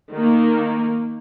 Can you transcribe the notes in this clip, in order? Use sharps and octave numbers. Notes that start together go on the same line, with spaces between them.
D#3 A#3